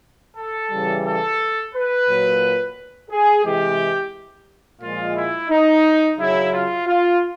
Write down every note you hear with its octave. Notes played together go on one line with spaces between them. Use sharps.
A4
C#3 E3 G3
A4
B4
A#2 F#3
G#4
C3 E3 G#3 G4
A#2 F3 G#3 F4
E4
D#4
C#3 F#3 E4
F4
F4